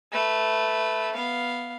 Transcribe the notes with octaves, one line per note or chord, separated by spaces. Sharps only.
A3 B4
B3 F5